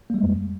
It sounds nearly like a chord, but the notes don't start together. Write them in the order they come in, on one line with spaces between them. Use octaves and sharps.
A#3 G3 G#3 F2